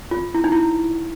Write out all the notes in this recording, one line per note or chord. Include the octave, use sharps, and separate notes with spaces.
F4
E4
D#4
E4